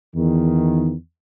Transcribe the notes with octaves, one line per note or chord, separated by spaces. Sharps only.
E2 D#3